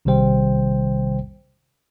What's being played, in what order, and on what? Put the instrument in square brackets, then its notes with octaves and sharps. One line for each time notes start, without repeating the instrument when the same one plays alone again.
[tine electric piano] A#1 C3 D#3 G3 C5 G5